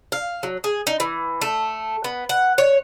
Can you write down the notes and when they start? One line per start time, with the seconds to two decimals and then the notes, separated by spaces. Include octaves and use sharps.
0.12 F5
0.43 F#3
0.64 G#4
0.87 D#4
1.00 E3
1.41 A3
2.04 B3
2.29 F#5
2.58 C#5